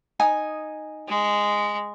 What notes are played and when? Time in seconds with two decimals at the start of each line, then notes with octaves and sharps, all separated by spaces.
0.20 D#4 G#5 D#6
1.08 G#3